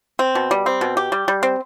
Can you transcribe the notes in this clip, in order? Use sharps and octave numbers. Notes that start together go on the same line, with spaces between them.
C4
B2
G3
C4
B2
G4
G3
G3
C4